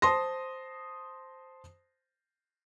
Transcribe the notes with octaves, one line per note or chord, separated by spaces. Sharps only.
C5 A5 C6 D#6 A#6